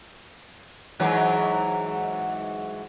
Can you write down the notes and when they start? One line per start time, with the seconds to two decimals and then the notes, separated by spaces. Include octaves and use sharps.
1.00 G#2 E3 F#3